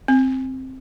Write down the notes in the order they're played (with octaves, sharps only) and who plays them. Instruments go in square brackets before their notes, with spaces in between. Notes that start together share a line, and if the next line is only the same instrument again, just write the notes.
[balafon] C4